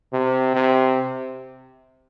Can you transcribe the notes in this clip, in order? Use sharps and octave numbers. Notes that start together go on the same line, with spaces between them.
C3
C3